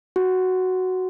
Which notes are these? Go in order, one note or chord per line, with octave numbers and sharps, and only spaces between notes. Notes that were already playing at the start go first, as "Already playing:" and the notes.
F#4